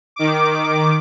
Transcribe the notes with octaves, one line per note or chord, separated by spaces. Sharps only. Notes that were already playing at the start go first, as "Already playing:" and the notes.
D#3 D6